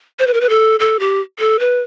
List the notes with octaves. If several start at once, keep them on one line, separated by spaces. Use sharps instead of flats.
C5
B4
A#4
B4
A4
A4
G4
A4
B4